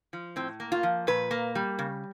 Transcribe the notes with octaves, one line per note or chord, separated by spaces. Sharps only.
F3
A2 C4
A#3
F4
F3
A#2 B4
A#3
G3
C#3